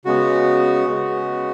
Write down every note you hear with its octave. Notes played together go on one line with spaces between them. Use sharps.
C#3 G#3 B3 F#4
C#3 G#3 B3